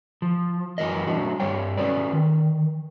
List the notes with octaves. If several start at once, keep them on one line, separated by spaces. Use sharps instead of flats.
F3
F#2 E3 F#4 A#4 D#5
F#3 G3 A3 D4 F#4
G2 G3 G4 C#5 G5
C#4 F#4 A4 B4 D5
D#3